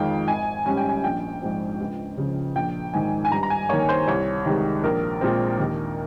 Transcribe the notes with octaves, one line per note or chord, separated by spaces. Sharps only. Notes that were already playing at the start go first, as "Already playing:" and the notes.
Already playing: F2 D#3 G#3 F5 G5
G#1 G#5
G#2 G3 C#4 G#5
G5
G#5
A#1 G5
G#2 F3 C4
C#2
C#3 F3
A#1 G5
G#2 D#3 G#5
G#5
G2 A#5
A#5
G#5
D#3 A#3 C#5
C5
C2 C#5
C3 D#3 G#3
A#1 A#4
A#2 G#3 C4
D#2